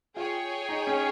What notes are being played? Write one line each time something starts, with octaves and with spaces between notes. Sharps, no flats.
F4 G#4 C#5 G5
D#4
C#4